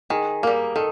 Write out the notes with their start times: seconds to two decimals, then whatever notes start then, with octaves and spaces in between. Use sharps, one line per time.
0.10 D#3 G#4
0.43 G3 A#3 A#4
0.76 D#3 A4